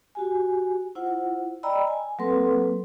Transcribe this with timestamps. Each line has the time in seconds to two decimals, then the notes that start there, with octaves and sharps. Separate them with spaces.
0.15 F#4 G4 G#5
0.95 E4 F4 C5 F#5
1.63 D5 D#5 G5 A#5 B5 E6
1.87 G#5
2.19 F#3 A#3 C4 A4 B4 C6